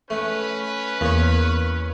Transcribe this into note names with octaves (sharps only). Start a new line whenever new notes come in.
A3 C#4 B4
E2 A#3 C#5